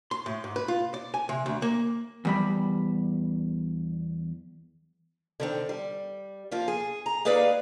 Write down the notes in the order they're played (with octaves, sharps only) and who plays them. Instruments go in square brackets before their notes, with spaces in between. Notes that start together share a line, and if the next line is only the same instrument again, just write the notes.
[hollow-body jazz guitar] C6
A2
G#2
B4
F4
D5
G#5
C3
D2
A#3
E2 G3 B5
[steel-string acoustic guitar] D3 D#3 C4
G3
F3 A#3 F4
G#4
A#5
A#3 D#4 G#4 B4 D5 F5